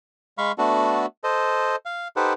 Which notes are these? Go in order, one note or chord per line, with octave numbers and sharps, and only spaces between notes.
G#3 F5 B5 C#6
A3 B3 D4 F#4 A4
A4 C5 D#5
F5
D#4 G4 A4 B4 C5 F#5